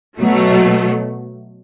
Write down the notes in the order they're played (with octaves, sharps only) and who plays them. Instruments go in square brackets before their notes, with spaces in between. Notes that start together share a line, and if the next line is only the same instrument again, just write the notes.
[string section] B2 F#3 A3